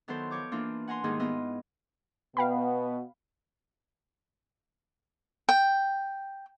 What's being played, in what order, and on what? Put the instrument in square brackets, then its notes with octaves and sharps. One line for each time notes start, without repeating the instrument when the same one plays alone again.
[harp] D#3 F#3 B3 E4 A4 C5
F3 C#5 D6 G6
E3 A#3 D4 F4
F#5 G#5 A#5 C6
G#2 D#3 G3 A#3 D#4 G#4
B3 E4 F4 D#5
[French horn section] B2 B3 [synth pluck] F5 G5 B5
[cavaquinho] G5